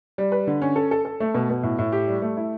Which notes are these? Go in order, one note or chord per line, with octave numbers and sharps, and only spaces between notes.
G3
B4
D3
C#4
A4
A4
A4
A3
B2
B2
A2
A2
G4
G3
A3
E4